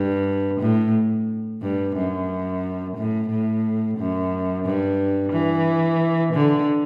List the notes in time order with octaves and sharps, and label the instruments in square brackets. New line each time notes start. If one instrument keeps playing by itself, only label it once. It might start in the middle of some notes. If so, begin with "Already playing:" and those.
Already playing: [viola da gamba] G2
A2
G2
F#2
A2
A2
F#2
G2
E3
D3